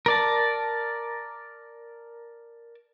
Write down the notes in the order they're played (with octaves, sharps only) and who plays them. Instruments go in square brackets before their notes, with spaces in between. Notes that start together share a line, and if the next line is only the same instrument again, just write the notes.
[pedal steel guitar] A#4 D5 A5